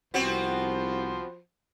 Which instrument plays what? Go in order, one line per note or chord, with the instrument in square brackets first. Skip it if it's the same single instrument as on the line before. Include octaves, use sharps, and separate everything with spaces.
[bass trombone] C2 [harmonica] F3 C5 [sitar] B3 C4 F#4